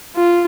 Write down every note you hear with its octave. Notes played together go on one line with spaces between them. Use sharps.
F4